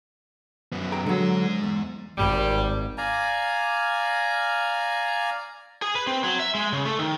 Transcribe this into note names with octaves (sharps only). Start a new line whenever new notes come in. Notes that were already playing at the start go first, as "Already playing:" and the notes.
F#2 B3
G#4 G5 A#5
D3 F#3 G#3 A#5
E2
G#1 A#2 G3
D5 F5 G#5 A#5
G#4
B4
C4
F#3
E5
G#3
C#3
A3
D#3